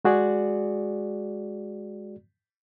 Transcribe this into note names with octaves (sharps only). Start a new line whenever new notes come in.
G#3 F#4 G#4 D5